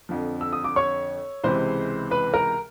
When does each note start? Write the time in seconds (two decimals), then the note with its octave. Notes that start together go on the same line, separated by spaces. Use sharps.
0.09 F2 D3 F3
0.41 E6
0.53 D#6
0.64 D6
0.76 C#5 C#6
1.44 C#2 C3 E3 G#3 C5 C6
2.11 B4 B5
2.34 A#4 A#5